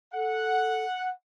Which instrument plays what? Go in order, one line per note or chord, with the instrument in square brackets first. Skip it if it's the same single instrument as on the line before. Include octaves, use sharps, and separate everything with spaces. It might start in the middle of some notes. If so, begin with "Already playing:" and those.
[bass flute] A4 [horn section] F#5